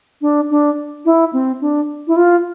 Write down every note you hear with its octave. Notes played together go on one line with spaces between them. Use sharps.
D4
D4
E4
C4
D4
E4
F4